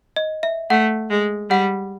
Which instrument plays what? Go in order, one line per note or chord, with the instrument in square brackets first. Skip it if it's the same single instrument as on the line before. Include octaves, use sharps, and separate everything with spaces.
[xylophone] D#5
E5
[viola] A3 [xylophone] F#5
[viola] G#3
[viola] G3 [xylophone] F#5